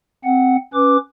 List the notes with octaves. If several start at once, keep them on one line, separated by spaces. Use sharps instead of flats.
C4 F#5
C#4 B4 D6